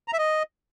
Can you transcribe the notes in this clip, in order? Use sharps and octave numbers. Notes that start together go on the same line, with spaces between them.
A#5
E5
D#5